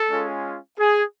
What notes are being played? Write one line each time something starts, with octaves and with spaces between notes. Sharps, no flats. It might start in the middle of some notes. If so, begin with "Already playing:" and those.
Already playing: A4
G#3 C#4 F4
G#4